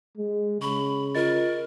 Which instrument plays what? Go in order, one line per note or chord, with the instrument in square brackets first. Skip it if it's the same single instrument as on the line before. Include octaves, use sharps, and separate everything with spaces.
[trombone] G#3
[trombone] C#3 [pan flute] B5 [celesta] C#6
[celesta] F4 D#5 A6 [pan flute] A#4